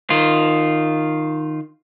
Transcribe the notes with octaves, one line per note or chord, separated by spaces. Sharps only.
D#3 F4